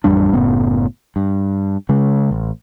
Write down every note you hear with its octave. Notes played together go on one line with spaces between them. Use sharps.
A1 F2 G3 D4
F#1 A2 C#3 B3
G2
C#3 G#3
A1